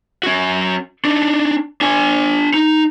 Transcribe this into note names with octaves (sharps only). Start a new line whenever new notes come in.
C#4 F#4
D4 D#4
D4 G#5
D#4